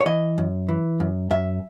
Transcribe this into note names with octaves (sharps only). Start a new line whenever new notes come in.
C#5
E3 D#5
F#2
E3
F#2
F#2 E5